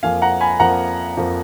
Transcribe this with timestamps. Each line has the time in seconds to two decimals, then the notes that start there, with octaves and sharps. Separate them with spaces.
0.03 F2 F3 A#3 F5 G#5
0.22 F#5 A#5
0.41 G#5 B5
0.60 F2 F3 A#3 F#5 A#5
1.17 F2 F3 A#3